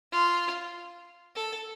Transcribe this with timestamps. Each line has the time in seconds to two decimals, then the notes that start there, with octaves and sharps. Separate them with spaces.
0.12 F4
1.36 A4